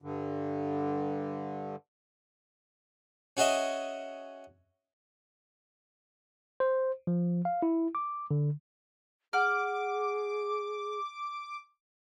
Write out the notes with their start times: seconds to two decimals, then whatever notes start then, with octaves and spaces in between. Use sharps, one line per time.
0.02 G2 D3
3.37 C#4 F#4 G#4 D#5 E5
6.60 C5
7.07 F3
7.45 F5
7.62 E4
7.95 D6
8.31 D3
9.33 G#4 F#5 D6 F6